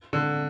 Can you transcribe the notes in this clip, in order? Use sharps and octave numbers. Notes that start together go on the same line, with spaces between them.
D3